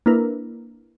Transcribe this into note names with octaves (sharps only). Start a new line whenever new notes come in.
A#3 D4 E4 A#4 B4